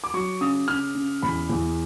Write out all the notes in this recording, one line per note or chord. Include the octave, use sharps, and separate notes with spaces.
D6
F#3 C#6
C#3 D#6
C#3 F6
C#3
E2 B5
E2